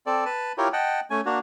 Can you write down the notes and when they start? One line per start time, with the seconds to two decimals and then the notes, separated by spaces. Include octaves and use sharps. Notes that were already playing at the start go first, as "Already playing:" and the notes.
0.06 C4 A4 D5
0.25 B4 A5
0.58 E4 F4 G4 A#4 C#5
0.73 D#5 F#5 G5 A5
1.10 A3 C#4 G#5
1.26 A#3 D4 F#4